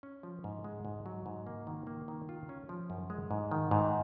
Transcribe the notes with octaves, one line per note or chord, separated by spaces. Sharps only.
C#4
F3
G#2
G#3
G#2
F#3
G#2
A#3
D#3
A#3
D#3
F4
C#4
F3
F#2
G#3
G#2
D#3
G#2